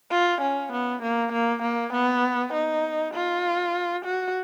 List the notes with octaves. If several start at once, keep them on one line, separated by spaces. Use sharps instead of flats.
F4
C#4
B3
A#3
A#3
A#3
B3
D#4
F4
F#4